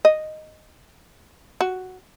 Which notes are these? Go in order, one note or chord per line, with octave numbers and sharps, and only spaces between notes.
D#5
F#4